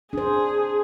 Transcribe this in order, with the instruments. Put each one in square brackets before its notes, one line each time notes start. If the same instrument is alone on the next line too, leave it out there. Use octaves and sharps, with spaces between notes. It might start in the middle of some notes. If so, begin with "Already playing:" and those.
[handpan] D4 C5 [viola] G#4